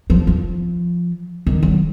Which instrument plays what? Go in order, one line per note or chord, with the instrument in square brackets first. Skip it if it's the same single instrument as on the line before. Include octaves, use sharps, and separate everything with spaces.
[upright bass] F3
F3
D#3
F#3